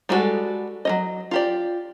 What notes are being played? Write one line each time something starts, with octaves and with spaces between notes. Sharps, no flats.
G3 G#3 D4 F#4 A4
F#3 C#4 D#5
F4 G4 D5